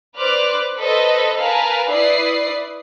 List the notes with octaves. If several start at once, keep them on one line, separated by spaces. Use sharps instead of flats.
B4 C5 D5 D6 F6 F#6
A4 B4 C5 D#5
A#4 B4 F5 G#5 A5
E4 B4 D5 D#6 C7